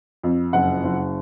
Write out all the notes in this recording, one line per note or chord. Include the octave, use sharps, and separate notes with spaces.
F2
F#1 F#5
F#1